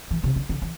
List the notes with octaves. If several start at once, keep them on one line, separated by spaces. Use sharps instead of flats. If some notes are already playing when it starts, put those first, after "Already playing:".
E3
C3
D3
D3
E3